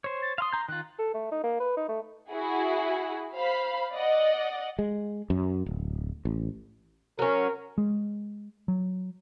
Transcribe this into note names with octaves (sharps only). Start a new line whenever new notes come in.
C5 C#5
A6
F5 C6 D#6
A#5 G6
D#3 F4 F#6
A4
A3
D#4
A#3
B4
D#4
A3
E4 F#4 G#4
C5 F5 B5
D5 D#5 F#5
G#3
F#2
D1
A1
F#3 C#4 A#4
G#3
F#3